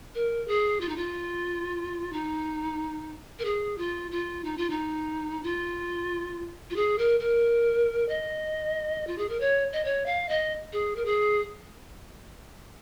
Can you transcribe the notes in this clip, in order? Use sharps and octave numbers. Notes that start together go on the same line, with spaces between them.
A#4
G#4
F4
D#4
F4
D#4
A#4
G#4
F4
F4
D#4
F4
D#4
F4
F4
G#4
A#4
A#4
D#5
F4
G#4
A#4
C#5
D#5
C#5
F5
D#5
G#4
A#4
G#4